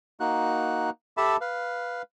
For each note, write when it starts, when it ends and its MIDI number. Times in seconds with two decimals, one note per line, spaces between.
0.20 0.90 58
0.20 0.90 63
0.20 0.90 66
0.20 0.90 90
1.17 1.37 67
1.17 1.37 69
1.17 1.37 76
1.17 1.37 81
1.17 1.37 83
1.41 2.02 71
1.41 2.02 77